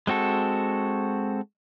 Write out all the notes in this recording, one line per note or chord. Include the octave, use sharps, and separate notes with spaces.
G#3 C4 F#4 A4